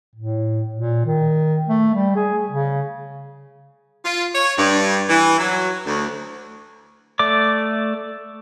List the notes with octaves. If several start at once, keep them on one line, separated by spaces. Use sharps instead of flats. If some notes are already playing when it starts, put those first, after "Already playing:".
A2
A#2
D#3
A3
G3
G#4
C#3
F4
C#5
G2
E3
F#3
D2
A3 D5 D6